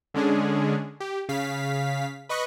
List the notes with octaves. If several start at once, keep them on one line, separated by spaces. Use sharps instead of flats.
D3 G#3 C#4 D4 G#4
G4
C#3 F5 B6
B4 D#5 B5 C#6 F#6